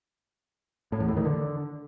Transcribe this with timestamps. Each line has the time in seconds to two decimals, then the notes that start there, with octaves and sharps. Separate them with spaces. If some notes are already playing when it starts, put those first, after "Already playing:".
0.92 A2
1.00 E2
1.08 A2
1.17 D#3
1.25 D3